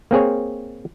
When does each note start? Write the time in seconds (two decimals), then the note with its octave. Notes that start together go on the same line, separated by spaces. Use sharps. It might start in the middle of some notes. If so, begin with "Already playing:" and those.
0.11 A#3 C4 G#4 C#5